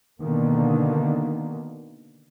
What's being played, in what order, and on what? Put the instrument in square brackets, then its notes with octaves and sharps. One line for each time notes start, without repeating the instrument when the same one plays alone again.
[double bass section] B2 D3 D#3 A#3